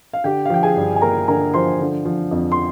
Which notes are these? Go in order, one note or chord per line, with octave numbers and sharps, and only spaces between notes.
F5
D3 G4 G5
F5
F3 G5
G#4 G#5
G2
G#5
A#3 A#4 A#5
D3 A#4 A#5
F3 C5 C6
D3
F3
F2
C6